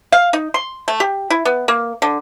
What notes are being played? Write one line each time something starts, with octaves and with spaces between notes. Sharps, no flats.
F5
D#4
C6
A3
G4
E4
B3
A#3
D3